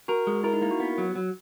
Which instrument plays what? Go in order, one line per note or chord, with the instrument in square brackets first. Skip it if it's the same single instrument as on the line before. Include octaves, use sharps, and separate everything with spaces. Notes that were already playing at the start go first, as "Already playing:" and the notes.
[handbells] F#4 [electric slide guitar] A#4
[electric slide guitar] G#3
[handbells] E4 [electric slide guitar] A#4
[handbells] D#4
[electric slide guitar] A#3 [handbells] E4
[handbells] F#4
[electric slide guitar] B3
F#3
F#3